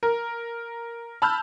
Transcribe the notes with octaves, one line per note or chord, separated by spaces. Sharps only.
A#4
A5 B5 E6 F6 G6